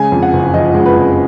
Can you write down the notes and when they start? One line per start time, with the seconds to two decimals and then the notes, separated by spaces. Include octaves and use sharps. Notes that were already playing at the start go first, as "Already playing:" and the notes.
Already playing: C#3 G#3 G#5
0.12 F2
0.23 F#5
0.33 F#1
0.54 F3 D#5
0.75 G#3
0.86 B4
0.97 F2